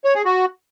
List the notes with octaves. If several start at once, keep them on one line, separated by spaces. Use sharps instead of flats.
C#5
G#4
F#4